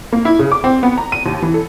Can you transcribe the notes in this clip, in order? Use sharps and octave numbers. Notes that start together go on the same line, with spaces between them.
A#3
E4
C#3
D6
C4
B3
A#5
D#7
D#2
E3
A4